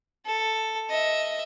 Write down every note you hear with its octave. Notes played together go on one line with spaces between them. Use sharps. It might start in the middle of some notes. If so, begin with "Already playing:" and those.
A4
D#5 E5